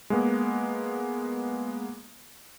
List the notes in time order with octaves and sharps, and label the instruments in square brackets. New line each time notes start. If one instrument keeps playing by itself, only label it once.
[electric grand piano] G#3 A#3 B3